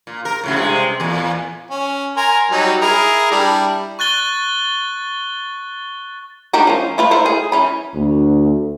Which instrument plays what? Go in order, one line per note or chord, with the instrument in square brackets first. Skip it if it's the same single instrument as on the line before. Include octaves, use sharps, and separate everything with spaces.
[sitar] A#2
A#4
A2 C#3 F#3
G2 C3 G#3
E2 A#2
[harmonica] C#4
A#4 G#5 C6
F#3 G3 D#4
E4 G#4 A#4
G3 D4 E4
[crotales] C#6 F#6 A6 G7
[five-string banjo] G3 D4 D#4 G4 A#4
F3 C#4
E4 F4 B4
E4 A4 A#4 C5
G#4
E3 C#4 B5
[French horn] D2